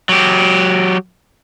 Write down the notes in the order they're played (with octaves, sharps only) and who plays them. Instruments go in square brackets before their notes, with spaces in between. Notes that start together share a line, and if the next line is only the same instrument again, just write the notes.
[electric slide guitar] F#3 G4